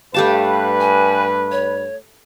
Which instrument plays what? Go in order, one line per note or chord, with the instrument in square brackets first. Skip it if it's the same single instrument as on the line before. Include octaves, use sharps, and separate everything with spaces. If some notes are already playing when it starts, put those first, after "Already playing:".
[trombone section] G2 B4 [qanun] A3 G4 A5 [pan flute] F5
[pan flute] G#5
C#5